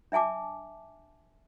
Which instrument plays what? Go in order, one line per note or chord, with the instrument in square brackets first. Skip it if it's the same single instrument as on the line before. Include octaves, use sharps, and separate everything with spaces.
[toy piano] D4 E5 G#5 A5 D6